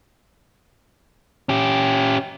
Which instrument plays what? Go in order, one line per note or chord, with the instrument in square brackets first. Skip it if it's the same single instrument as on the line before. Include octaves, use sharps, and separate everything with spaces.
[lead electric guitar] C#4 G4